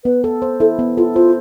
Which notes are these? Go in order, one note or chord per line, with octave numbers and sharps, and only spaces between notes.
B3 B4
A4
C5
E4 A4
B3
F4 A4
F4 C5